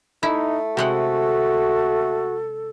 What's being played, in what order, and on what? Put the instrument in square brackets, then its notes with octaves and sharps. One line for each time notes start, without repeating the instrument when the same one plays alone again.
[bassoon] A3 [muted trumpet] D#4 [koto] E4
[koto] C3 G#3 F#5 [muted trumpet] F#4 [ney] A4